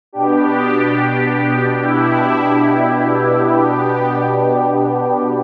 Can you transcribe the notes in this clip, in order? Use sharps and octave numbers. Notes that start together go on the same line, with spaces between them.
B2 B3 D4 G4
E4
B2 B3 D4 G4